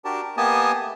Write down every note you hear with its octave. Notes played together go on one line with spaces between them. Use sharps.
D4 F#4 G4 A#4 A5
A#4
A#3 B3 G4 D#5 G#5 A5
A3 G4